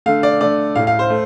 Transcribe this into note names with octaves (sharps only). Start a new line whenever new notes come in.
D3 A3 F5
D5
D3 A3 D5
A2 A3 F5
F5
C5
A3